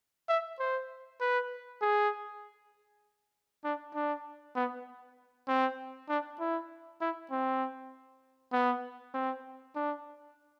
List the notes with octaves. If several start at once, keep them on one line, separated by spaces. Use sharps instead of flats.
E5
C5
B4
G#4
D4
D4
B3
C4
D4
E4
E4
C4
B3
C4
D4